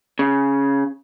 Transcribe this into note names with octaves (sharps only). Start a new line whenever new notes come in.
C#3